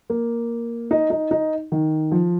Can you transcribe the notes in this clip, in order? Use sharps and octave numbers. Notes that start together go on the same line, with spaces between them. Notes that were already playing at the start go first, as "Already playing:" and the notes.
A#3
D#4
D#4
D#4
D#3
F3